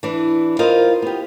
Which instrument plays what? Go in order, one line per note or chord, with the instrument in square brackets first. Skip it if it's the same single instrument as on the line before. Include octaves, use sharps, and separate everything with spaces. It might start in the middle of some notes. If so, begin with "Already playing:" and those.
[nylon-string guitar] E3 D4
F4 A#4 C5 D#5
B3 G4